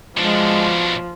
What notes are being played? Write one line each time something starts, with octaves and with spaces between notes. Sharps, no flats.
B2 F3 G#3 D4